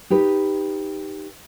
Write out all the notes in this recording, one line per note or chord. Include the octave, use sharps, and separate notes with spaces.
D#4 G4 B4